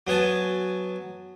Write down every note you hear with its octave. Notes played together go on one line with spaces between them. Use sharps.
F#3 B3 G#5 A5